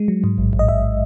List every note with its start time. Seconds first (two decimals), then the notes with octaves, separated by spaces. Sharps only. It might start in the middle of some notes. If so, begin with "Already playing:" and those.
Already playing: G#3
0.08 F#3
0.24 G#2
0.38 A1
0.53 A1
0.59 D#5
0.68 A1 E5